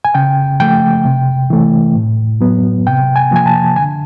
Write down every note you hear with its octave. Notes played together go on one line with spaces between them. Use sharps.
G#5
C#3 G5
F3 A3 G5
C3
E3 A3
A2
F#3 B3
C3 G5
G#5
F3 A#3 G#5
A5
D3 G#5